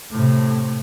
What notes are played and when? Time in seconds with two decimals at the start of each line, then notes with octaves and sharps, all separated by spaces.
0.11 A2 C3